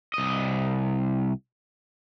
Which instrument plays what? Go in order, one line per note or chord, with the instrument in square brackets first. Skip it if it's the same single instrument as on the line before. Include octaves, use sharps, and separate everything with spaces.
[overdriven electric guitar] C2 D#5